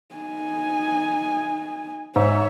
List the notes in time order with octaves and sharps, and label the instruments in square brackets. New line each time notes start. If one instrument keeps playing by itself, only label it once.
[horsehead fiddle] D#4 G#5
[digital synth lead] G#2 [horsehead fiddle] C#5 E5